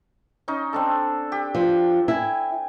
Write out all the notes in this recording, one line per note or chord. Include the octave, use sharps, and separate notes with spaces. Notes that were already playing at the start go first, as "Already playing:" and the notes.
C#4 D#4
C4 D4 A4
G4
F3
E4 G5 G#5